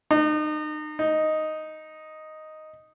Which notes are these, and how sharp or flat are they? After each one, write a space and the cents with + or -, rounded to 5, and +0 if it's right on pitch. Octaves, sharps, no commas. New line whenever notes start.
D#4 -35
D#4 +0